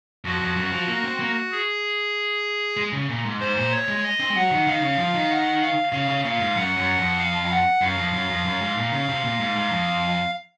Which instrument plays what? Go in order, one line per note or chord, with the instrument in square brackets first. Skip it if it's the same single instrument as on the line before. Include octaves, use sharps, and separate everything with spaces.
[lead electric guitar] F2 [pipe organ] F#4
[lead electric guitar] F2
F#2
F3
A#3
C4
A#3
[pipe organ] G#4
[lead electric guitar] G#3
C#3
A#2
G#2
[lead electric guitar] G#2 [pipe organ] C5
[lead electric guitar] A#2
[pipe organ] C#5
[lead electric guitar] G#3
[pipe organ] D#5
[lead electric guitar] C4
G#3
[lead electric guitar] F#3 [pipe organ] F#5
[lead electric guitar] D#3
[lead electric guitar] D#3 [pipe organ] F5
[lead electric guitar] C#3
F3
D#3
[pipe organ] F#5
F5
[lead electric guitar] C#3 [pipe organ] F5
[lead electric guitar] C#3
[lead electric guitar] A#2 [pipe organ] F5
[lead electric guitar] G#2
[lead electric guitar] F#2 [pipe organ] F#5
[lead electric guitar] F#2
F2
[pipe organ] F5
F#5
[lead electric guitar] F#2 [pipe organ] F5
[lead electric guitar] F2
F#2
F2
F#2
G#2
A#2
C#3
C3
A#2
G#2
G#2
F2